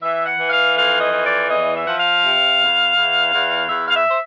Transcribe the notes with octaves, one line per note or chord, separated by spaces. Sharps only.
E3 E5
F#5
E3
F5
F2 F5
D#5
E3
D5
E2 D#5
E5
F3 F#5
F5
C3
E2
E2
E2
E2 E5
F5
E5
C5